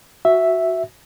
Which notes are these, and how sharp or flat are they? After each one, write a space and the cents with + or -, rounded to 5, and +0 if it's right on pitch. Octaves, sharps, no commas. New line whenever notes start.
F#4 +0 E5 +0